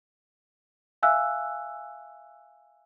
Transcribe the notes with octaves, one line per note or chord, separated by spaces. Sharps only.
E5 F5 G#5 E6 F#6